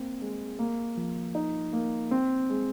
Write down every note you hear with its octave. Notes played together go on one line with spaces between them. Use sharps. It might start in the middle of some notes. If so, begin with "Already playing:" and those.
Already playing: A#3 C4
G#3
A#3
F3
D#4
A#3
C4
G#3